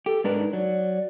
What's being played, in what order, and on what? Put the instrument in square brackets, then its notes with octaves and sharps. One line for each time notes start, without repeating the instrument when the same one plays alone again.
[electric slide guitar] G4 [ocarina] A4
[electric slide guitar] G#2 D4 A#4 [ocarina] B4
[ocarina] D#4
[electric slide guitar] F#3 [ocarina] D5